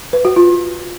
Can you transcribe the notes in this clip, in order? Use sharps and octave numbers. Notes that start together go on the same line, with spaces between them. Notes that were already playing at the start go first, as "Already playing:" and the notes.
B4
F#4
F4